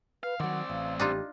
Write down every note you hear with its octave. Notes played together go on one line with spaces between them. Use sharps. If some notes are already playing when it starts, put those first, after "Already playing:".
B4 F5
D#3 F#3 C4 D5 F#5
A1 F5
D4 D#4 F4 G4